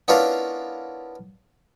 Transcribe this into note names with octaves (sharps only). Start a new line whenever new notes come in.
B3 C#4 D4 E4 F4 A#4